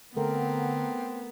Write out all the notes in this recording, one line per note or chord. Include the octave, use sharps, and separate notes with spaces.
D3 A3 B3 C4 A4 A#4